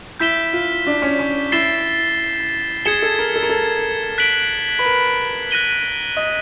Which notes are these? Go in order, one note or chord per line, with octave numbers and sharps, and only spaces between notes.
E4 G6 B6 E7 G7
F4
D4
C#4
C#4
E4 A6 C7 E7 G7
G#4 G#6 C#7 E7 G7
A4
A#4
A4
A#4
A4
F#6 B6 D7 F#7
B4
A#4
F#6 A#6 D#7 G7
D#5